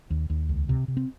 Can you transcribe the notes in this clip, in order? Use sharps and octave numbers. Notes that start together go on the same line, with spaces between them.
D#2
D#2
C#2
C3
C3
C4